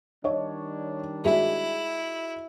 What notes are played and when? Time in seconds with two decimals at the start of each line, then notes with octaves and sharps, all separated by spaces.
0.24 D#3 G3 D4 C#5 D#5
1.25 G#3 E4 F#4 G#4 E5